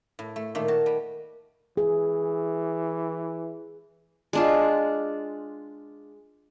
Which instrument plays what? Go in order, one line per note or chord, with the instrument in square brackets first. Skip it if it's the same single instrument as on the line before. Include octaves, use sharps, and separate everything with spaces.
[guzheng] A2
A3
A#2 D#3 A3
F#4 A5
G3
[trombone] E3 [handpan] G#4
[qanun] G#3 D4 F4